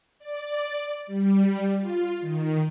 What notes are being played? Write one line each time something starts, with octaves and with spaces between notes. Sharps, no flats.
D5
G3
F4
D#3